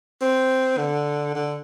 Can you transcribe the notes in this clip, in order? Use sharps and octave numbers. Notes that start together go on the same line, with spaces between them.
C4
D3
D3